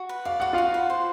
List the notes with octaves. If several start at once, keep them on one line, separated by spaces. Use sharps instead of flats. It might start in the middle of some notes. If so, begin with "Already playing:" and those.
Already playing: F#4
B4
D5 F5
F#4 F#5
F4 F#4 F5
B4
C5